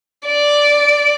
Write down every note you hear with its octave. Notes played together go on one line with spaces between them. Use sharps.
D5